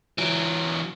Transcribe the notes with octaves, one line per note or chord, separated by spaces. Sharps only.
E3 F#3